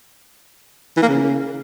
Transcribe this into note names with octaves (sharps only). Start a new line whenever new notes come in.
E3
A#3
C#3